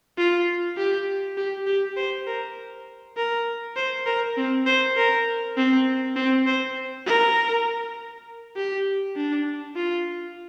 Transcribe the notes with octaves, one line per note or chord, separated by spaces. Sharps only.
F4
G4
G4
G4
C5
A#4
A#4
C5
A#4
C4
C5
A#4
C4
C4
C5
A#4
G4
D4
F4